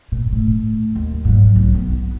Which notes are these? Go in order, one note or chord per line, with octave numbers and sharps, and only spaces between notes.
A#2
A2
D#2
G#2 F#3
B1
B3